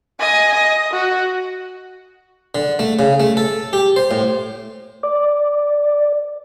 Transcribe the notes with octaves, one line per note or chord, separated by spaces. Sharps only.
D#5 G#5
D#5
F#4
D3
A3
C#3
A3
A4
G4
C5
A2
D5